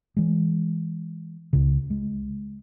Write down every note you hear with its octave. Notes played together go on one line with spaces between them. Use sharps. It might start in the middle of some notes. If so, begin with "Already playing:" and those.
E3 G#3
C#2 C#3
G#3